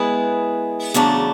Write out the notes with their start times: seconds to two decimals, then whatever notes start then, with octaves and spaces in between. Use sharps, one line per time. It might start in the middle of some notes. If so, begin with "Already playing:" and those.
Already playing: G#3 B3 E4 G#4 B4
0.94 E2 C#3 F#3 A3 D4